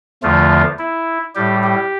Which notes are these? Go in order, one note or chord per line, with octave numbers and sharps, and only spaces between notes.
E2 D3 F3 A3 F4
E4
A2 G3 G4
G4